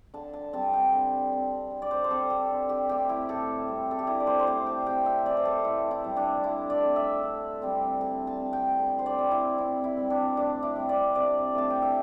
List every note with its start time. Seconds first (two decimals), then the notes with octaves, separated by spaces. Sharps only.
0.14 D3 A5
0.33 A5
0.53 G3 C4 A5
0.73 G5
0.93 D3
1.32 C4
1.71 D3
1.82 D5
1.91 C5
2.04 C5
2.11 C4 A4
2.30 G4
2.50 D3
2.69 G4
2.89 A3 C4 G4
3.09 E4
3.29 A2 A4
3.68 G3 C4
3.91 A4
3.99 G4
4.07 D3 E4
4.20 D5
4.27 C5
4.40 C5
4.47 A3 C4 D5
4.66 G5
4.86 C3 G5
5.06 E5
5.25 E3 C4 D5
5.37 C5
5.45 A4
5.64 A2 E4
5.91 E4
6.04 G3 C4
6.17 D4
6.44 D3 E4
6.70 D5
6.83 A3 C4
6.96 E5
7.22 D3
7.62 G3 C4
8.01 D3 A5
8.27 A5
8.40 C4
8.53 G5
8.79 D3
8.99 C5
9.06 D5
9.19 G3 C4
9.31 E4
9.58 C3 E4
9.84 E4
9.97 G3 C4
10.10 D4
10.37 A2 D4
10.63 E4
10.76 G3 C4
10.89 D5
11.15 C3 D5
11.55 A3 C4 A5
11.70 G5
11.82 E5